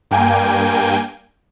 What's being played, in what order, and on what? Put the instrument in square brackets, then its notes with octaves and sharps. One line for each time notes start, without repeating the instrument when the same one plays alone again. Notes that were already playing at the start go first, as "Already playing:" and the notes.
[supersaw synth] G2 A#3 G5 G#5